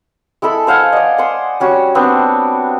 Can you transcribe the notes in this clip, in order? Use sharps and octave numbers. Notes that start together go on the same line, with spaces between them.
G#3 E4 A4 B5
C5 F5 F#5 G#5
D5 D#5
F#5 G#5 C6
G3 C#4 F#4
B3 C4 D4 C6